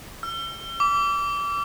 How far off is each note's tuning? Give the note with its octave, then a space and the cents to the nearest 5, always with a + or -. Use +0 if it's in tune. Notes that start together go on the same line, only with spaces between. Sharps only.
E6 +45
D6 -30